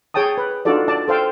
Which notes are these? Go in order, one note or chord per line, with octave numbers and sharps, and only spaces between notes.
G#4 C#5 G5 A5 D#6
B4
D4 D#4 F4 F#4 A4 D5
D5 A5
A4 C5 F5 G5